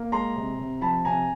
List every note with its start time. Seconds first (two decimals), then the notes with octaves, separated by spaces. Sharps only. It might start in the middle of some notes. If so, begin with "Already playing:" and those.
Already playing: A#3
0.12 G#3 A#5 C6
0.36 C3
0.59 C3
0.81 F3 A5 B5
1.05 C3 G#5 A#5